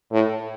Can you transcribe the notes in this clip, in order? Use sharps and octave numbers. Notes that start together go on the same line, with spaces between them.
A2